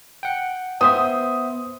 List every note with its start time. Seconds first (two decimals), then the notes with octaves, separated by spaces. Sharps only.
0.23 F#5 G5
0.81 B3 C5 E5 D#6